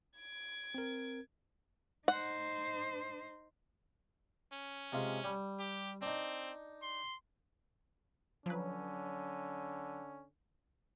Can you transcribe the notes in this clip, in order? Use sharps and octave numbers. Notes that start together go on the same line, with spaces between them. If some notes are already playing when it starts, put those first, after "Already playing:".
G#6 D7
C4 A#4
D#4 C5 F#5
C#4
C3 G#3 F4
G3
G4
C4 D4 D#4
C6
D3 F3 F#3 C#4 B4